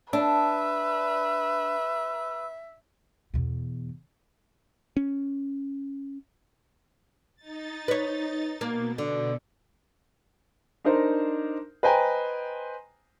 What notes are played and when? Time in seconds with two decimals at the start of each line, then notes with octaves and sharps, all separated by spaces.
0.13 D4 B4 E5 E6
3.34 E2 B2
4.97 C#4
7.36 D#4 A6
7.88 B4 C#5
8.61 B2 A#3
8.98 B2 D3
10.85 D4 D#4 A#4 C5
11.83 B4 C5 D#5 G5 G#5 A#5